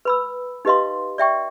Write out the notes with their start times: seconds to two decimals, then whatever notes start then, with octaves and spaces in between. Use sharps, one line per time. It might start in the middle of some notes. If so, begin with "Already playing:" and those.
0.05 B4 B5 E6
0.65 D#4 G4 B4 D#5 F5 C6
1.18 D5 E5 G5 C#6